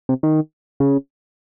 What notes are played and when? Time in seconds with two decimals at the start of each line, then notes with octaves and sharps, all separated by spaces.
0.09 C3
0.23 D#3
0.80 C#3